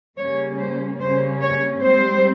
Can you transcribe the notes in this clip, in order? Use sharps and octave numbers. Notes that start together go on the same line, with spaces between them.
C#3 G3 A#3 C#4 C#5
C5
C#3 G3 A#3 C#4 C5
C#5
G#2 G3 C4 C5